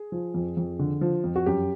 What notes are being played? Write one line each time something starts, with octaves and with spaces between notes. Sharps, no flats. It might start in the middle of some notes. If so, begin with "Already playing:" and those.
Already playing: G#4
F3
F2
F2
D3
F3
F2
F#4
F#2 G4